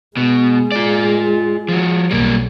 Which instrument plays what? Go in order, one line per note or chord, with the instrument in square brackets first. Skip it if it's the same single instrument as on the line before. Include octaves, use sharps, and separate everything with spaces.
[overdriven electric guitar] B2 [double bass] G#3
[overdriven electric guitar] F4 D5
F3 F#4
[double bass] B1 [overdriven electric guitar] G3 A#3